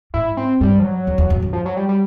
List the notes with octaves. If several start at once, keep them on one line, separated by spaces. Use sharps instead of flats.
G#2 E4
C4
G2 G3
F3
F#3
E2
E2
F2
F#2
F3
F#3
G3
G3